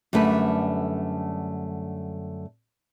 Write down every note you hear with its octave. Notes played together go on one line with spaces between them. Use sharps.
F#2 D3 G3 A3 B4